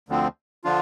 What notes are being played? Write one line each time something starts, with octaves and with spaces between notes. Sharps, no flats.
D2 D3 F3 C4
D3 F3 D4 F4